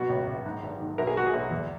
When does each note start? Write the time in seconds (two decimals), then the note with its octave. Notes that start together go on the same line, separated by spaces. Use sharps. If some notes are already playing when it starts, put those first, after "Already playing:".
Already playing: B2 F#3 F#4
0.09 C#2
0.27 C#2
0.45 G#2
0.63 G#1
0.80 D#3
0.98 B1 A#4
1.07 G#4
1.16 G#3 F#4
1.26 G#4
1.33 B1
1.51 E2